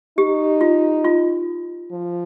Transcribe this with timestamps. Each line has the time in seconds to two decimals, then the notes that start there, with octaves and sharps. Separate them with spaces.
0.18 D#4 G4
0.61 F4
1.05 F4
1.91 F3